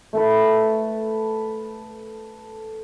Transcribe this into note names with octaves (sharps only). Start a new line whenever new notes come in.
A3 A4 B4